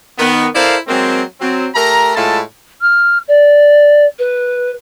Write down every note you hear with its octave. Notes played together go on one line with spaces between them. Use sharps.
D#3 B3
E4 A4 A#4 C5 D5 F5
F#3 G#3 A#3 C4
F#3 C4
A3 G4 A#4 A#5
A2 G#3 E4 F4 A4 A5
F6
D5
B4